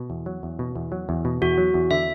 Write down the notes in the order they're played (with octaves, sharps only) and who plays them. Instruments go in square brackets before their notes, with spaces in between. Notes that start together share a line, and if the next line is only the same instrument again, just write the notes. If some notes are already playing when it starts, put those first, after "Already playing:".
Already playing: [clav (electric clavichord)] B2
E2
F#3
E2
B2
E2
F#3
E2
B2
[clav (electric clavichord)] E2 [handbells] F#4
[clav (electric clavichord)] F#3
E2
[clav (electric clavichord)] D3 [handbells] E5